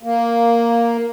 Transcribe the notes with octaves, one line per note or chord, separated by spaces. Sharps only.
A#3